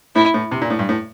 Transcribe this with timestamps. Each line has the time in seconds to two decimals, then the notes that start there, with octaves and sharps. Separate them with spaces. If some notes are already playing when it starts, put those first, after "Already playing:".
0.15 A2 E4
0.34 A2
0.51 C3
0.62 A#2
0.70 A2
0.79 G2
0.89 A2